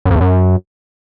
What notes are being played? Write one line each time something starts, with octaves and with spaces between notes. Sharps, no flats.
F#2
F2
E2
F#2